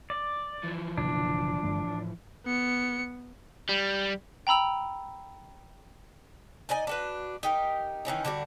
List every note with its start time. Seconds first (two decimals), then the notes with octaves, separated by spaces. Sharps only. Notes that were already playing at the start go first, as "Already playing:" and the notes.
0.10 D5
0.63 E3 F3
0.98 F#1 B2 D3 D4
1.63 G1 G2 A3
1.84 A2
2.46 B3 C#7
3.69 G3
4.47 G5 A#5 B5 E6 F7
6.69 D#4 D5 D#5 G#5
6.87 D4 F#4 B4
7.43 D#4 G4 A#4
8.05 D#3 E3 C#4 D#4
8.25 D3 G3 D4 F#4